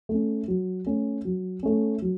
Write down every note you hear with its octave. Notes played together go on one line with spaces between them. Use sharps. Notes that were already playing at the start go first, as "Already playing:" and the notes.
A3 C#4
F#3
A3 C#4
F#3
A3 C#4
F#3